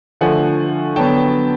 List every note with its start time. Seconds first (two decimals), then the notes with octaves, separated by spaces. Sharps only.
0.21 D3 F3 A3 F#5 G#5
0.96 D3 F#3 B3 G5 A5